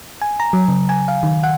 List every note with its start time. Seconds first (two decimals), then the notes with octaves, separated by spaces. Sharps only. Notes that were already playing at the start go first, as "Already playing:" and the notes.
0.21 G#5
0.40 A#5
0.53 F#3
0.68 C#3
0.89 G#5
1.08 F5
1.23 D#3
1.43 F#5